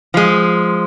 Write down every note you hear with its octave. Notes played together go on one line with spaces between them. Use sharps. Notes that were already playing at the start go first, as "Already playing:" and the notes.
F3 G#3